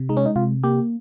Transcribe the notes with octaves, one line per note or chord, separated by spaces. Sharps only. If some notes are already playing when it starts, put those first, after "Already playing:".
Already playing: C3
G#3 D#4
C#4
D#4
C3 F4
A#3 G4